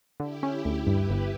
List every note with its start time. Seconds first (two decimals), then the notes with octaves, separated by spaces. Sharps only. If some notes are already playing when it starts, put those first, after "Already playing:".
0.20 D3 E4 G4
0.43 C#4
0.65 D2
0.87 G2 G4 B4
1.09 G1